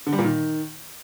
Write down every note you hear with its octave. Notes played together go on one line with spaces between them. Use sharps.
D3
G3
A#2
D#3